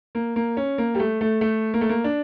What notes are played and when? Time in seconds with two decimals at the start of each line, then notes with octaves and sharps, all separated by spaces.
0.15 A#3
0.36 A#3
0.57 C#4
0.78 A#3
0.95 G3
0.99 A3
1.21 A3
1.41 A3
1.74 A#3
1.81 A3
1.89 A#3
2.04 D4